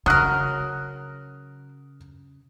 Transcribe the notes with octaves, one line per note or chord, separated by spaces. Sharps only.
C#3 F#3 A#4 D#6 F#6